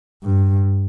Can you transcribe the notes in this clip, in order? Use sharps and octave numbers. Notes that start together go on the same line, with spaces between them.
G2